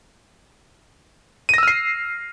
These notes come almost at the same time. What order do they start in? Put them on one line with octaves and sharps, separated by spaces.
D#7 A#6 E6 F6 C7